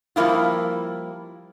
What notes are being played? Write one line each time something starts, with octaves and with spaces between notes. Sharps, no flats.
F3 G3 A#3 E4 F4